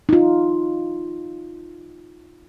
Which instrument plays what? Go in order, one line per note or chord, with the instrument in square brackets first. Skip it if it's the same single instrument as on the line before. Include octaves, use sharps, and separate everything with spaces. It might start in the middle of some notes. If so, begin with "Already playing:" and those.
[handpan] D#4 F4